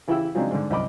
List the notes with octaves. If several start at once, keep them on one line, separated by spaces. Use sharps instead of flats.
C#3 E3 E4 G4 G5 E6
C#3 F#3 G#3 C4 D4 D#4
G#2 D3
C2 F#2 D#5 B5 D6